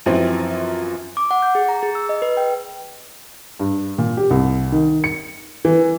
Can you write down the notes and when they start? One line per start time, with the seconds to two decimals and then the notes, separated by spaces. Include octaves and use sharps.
0.06 F#2 E3 F3 C4
1.17 D6
1.31 F#5
1.42 G6
1.55 G#4
1.69 A#5
1.83 G#4
1.95 E6
2.09 D#5
2.22 B4
2.37 G5
3.60 G2
3.98 A#2
4.17 G4
4.30 C2
4.72 D#3
5.04 C#7
5.65 E3